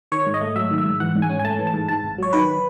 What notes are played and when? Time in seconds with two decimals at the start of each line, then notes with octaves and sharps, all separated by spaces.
0.12 D#3 C#5
0.27 G#2
0.34 D#5
0.41 A3
0.56 F#3 E5
0.71 D#3
0.78 E5
0.85 G#2
1.00 E3 F#5
1.15 G#2
1.22 G#5
1.29 C#4
1.39 G#5
1.44 A3 A5
1.59 E3
1.67 A5
1.74 G#2
1.88 G#2 A5
2.03 G#1
2.18 F#3 C#5
2.33 D#3 B4